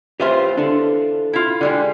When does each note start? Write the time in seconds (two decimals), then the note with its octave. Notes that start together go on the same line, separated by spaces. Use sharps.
0.20 E3 F4 G4 B4 C5 E5
0.57 D4 A4
1.33 E4 F4
1.61 D3 G3 G#3